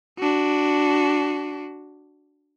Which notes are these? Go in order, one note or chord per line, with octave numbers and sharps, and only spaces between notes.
D4 F#4